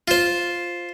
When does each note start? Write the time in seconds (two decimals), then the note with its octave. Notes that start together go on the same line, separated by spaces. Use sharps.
0.08 F4 C5